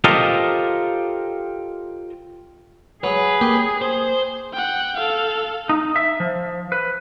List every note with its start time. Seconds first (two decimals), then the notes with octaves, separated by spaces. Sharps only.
0.04 F4 G4 A4 A#4 C5 D#5
3.04 F#3 G#4 B4
3.41 A#3 G4
3.82 C5
4.53 F#5 G5
4.96 A4 F5
5.69 D#4
5.96 E5
6.20 F3
6.72 B4